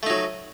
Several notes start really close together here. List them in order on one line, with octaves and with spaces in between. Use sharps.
A3 D#4 F#3